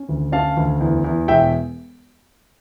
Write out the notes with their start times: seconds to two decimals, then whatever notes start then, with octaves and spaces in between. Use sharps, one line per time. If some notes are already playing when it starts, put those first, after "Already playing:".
Already playing: C#4
0.09 D2
0.32 C#4 F5 A5
0.57 D2
0.80 E2
1.04 E2
1.28 E1 E5 G5